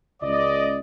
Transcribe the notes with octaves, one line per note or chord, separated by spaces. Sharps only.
C#2 D5 D#5